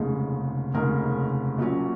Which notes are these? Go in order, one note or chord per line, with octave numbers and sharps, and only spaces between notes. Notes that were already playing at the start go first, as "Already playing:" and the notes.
Already playing: F1 D#2 C#3 G#3
F1 D#2 C#3 G#3 A#4
A#1 A#2 F#3 C#4